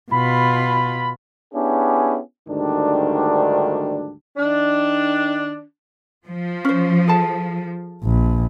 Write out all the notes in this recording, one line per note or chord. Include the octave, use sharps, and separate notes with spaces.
B2 F4 B5
B3 C#4 D4 E4 G4 G#4
D2 G#2 D#3 G3 D4
D#3 D4
F3
C#4 C5
G#4 A4 A5
A#1